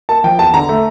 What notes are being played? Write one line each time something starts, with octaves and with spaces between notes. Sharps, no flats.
A#3 A5
F3 G5
E2 A5
D3 A#5
A3